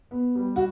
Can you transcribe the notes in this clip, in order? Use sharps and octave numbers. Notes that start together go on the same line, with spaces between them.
B3
G3
F#4